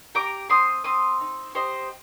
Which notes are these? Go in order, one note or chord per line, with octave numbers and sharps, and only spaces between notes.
G4 A#5 D6
C4 C6 D#6
C4 C6 D#6
D#4
G4 C5 D#5